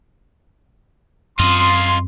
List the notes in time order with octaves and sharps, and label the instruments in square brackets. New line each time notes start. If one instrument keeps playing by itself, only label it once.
[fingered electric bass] F#2 C4 [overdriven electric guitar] F4 D#5 [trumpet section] C6